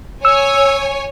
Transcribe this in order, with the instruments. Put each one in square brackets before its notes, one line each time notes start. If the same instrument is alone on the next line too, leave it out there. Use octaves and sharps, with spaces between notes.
[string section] C#5 G#5 [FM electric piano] E6